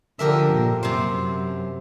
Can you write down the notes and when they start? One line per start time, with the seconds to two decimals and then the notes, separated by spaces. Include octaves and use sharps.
0.19 D3 F3 G4 A#4 E5
0.53 A#2
0.83 F#2 C3 C5